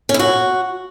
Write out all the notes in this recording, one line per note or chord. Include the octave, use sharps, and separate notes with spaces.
C#4
E4
F#4